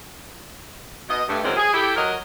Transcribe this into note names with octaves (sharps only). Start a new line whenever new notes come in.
B2 D#5
G2 A3
F#2 D#3 E3 G#3 C4 C#4
G#4
E4 G4 A4
F#3 A#4 D#5